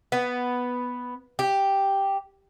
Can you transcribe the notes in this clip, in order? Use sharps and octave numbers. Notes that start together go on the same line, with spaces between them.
B3
G4